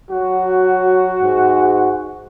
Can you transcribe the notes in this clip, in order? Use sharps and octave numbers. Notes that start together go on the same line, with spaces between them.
F#3 F#4
G#2